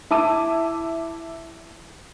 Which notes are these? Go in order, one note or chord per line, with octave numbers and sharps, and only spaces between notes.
E4 A5 D6 D#7